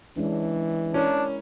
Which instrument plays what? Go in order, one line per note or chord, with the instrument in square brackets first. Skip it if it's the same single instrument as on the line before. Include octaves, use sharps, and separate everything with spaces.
[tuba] E3 [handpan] G#3 C#4 D4
[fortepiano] C#4 [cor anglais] D4 [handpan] E4 A#4